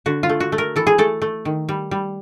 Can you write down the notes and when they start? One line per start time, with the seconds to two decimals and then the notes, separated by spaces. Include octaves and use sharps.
0.06 D3 F#4
0.23 F4
0.29 A3
0.40 F#4
0.52 A3
0.58 A#4
0.76 E3 A4
0.87 G#4
0.98 A3 A4
1.22 A3
1.45 D#3
1.69 G3
1.91 G3